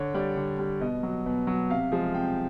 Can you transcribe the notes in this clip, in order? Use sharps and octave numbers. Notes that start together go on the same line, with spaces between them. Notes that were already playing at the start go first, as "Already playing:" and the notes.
Already playing: D3 C#5
G3 D5
D3
G3
B2 D#5
F#3
B2
F#3
C3 F5
F3 G#3
C3 G5